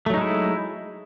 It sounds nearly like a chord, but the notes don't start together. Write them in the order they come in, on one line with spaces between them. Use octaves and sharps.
A3 F#3 D#4 G#3 E4